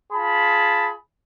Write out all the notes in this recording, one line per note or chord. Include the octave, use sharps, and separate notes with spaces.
F4 G#4 A5 B5